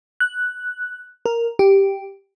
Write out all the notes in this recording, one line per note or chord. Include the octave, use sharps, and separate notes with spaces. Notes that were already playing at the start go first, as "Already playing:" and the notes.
F#6
A#4
G4